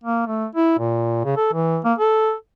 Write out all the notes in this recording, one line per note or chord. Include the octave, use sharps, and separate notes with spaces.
A#3
A3
E4
A#2
C#3
A4
E3
A#3
A4